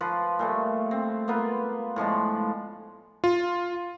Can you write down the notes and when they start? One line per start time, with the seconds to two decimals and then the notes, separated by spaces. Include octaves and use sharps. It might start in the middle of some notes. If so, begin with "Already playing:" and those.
0.01 F3 F4 B4
0.39 A#2 G3 A3
0.91 C4
1.28 A#3 B3 F4 B4
1.96 A2 F3 G#3 D4
3.24 F4